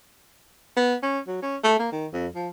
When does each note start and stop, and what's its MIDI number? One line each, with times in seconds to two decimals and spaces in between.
0.77 0.95 59
1.03 1.19 61
1.27 1.39 54
1.42 1.57 61
1.64 1.77 57
1.79 1.88 58
1.92 2.07 51
2.13 2.27 41
2.35 2.48 53